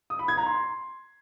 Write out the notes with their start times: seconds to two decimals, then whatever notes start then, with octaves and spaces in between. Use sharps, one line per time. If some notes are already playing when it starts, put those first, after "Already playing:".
0.10 D#6
0.19 B5
0.28 G#6
0.37 A#5
0.46 C6